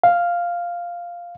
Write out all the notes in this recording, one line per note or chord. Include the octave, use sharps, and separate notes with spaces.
F5